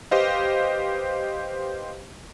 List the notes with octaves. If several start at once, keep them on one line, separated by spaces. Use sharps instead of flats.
G4 B4 C5 D#5 F5